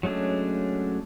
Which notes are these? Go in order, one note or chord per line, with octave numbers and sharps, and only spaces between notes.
F#3 G#3 A3 C#4 D4